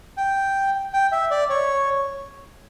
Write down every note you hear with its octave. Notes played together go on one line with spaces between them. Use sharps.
G5
G5
E5
D5
C#5